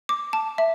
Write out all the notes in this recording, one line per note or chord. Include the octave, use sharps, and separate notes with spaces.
D6
A5
E5